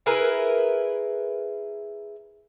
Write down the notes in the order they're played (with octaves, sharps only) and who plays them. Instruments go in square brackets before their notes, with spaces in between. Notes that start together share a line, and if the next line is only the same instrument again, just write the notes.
[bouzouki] E4 G#4 A#4 B4